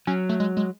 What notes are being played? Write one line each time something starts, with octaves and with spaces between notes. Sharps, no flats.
F#3 C#4
A3
G#3
G#3